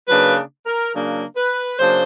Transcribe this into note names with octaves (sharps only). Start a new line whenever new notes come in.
C#3 F#3 A#3 D4 B4
A#4
C#3 F#3 A#3 D4
B4
C#3 F#3 A#3 D4 C5